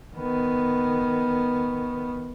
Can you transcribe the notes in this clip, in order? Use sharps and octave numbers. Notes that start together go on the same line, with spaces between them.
D#3 B3